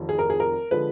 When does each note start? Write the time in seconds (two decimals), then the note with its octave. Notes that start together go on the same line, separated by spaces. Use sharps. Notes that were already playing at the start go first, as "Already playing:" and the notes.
Already playing: F1 F2 D#3
0.09 G#4
0.19 A#4
0.30 G#4
0.40 A#4
0.71 D3 F3 G#3 B4